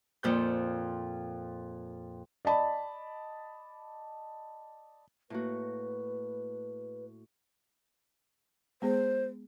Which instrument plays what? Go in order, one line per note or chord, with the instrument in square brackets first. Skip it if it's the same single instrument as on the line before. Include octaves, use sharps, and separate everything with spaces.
[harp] F2 A#2 G6
[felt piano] D5 D#5 A5 B5
[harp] A2 A#3 F#4 [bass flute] B4
[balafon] G#3 B3 G#4 [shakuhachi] C5